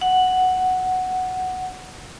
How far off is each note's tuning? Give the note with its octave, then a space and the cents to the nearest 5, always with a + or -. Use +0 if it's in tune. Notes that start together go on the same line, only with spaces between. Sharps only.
F#5 +0